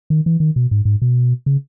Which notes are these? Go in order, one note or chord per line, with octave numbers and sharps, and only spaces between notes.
D#3
E3
D#3
B2
G#2
G#2
B2
C#3